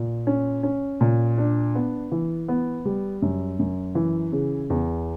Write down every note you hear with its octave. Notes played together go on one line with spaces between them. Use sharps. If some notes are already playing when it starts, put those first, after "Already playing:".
Already playing: A#2
C#4
C#4
A#2
D4
B3
E3
B3
G3
F#2
F#2
E3
C#3
E2